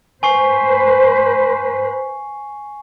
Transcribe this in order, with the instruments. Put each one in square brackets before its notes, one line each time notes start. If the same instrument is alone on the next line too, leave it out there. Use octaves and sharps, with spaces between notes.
[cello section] B4 C5 [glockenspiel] G#5 C#6 C7